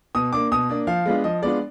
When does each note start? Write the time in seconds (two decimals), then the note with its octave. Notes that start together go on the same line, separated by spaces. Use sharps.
0.15 B2 D#6
0.33 A#3 D4 D6
0.51 B2 D#6
0.69 A#3 D4
0.87 F3 F5
1.06 G#3 B3 D4 F4
1.24 F3 D#5
1.42 G#3 B3 D4 F4 D5